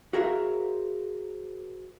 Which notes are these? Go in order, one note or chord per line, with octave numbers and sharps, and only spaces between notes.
F#4 G#4 A#4 C5 E5 F5